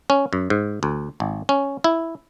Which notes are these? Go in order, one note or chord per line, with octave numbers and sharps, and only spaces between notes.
C#4
F#2
G#2
D2
G#1
C#4
E4